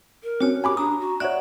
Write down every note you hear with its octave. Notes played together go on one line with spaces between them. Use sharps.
A#4
C4 C#4 F#4 C#5
G4 G#5 B5 D6
D4 A#5 D#6
F#4
C#5 D5 E5 F#5 F#6